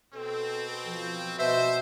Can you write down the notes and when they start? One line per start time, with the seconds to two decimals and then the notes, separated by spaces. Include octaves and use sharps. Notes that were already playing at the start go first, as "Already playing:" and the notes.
0.14 B2 C4 A4
0.84 F3
1.39 B2 C5 D#5 E5